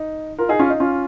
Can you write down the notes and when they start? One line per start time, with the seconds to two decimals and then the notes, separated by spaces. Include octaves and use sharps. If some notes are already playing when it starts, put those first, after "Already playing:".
Already playing: D#4
0.38 F4 A#4
0.49 D#4 G#4
0.59 C#4 F4
0.70 D#4
0.80 C#4 F4